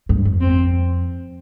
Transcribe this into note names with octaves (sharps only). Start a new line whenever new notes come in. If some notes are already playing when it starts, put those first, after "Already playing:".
G2
F2
C4